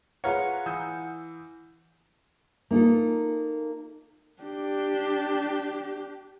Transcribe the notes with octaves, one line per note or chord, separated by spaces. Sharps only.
F4 G#4 B4 C#5 F#5 A#5 F6
E3 D#6 E6 G6
A#3 D#4 F4 A4
D4 G4